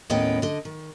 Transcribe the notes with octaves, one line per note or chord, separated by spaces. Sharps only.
D#2 A2 B3 C#4 D#5 G5
D3 D#5
D#3